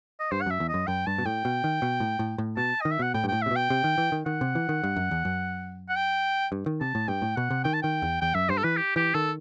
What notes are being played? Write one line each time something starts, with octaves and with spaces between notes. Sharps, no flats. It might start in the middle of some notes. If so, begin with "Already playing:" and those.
D#5
G2 C5
F#5
F#2 E5
E2
D#5
F#2
F#2 G5
G2 A5
B2
A2 G5
B2
D#3
B2
A2
A2
A2
B2 A5
D#3 D#5
E5
B2 F#5
A2 G5
G2
A2 G5
C3 E5
B2
G5
C3
D#3
E3
D#3
D#3 F#5
C3
E3
D#3
G2
F#2
E2
F#2
F#5
G5
G2
D#3
C3 A5
A2
G2 G5
A2
B2 F#5
C3
D#3 G5
A5
D#3 G5
E2
E2 G5
F#2 E5
G2 C5
A4
E3 B4
G4
E3 G4
D#3 A4